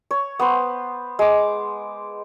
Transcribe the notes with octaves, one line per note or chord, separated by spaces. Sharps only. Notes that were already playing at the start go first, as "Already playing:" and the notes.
C#5
B3 C5
G#3 D6